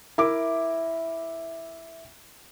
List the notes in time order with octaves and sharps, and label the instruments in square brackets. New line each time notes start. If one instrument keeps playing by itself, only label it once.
[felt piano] E4 A#4 E5 D6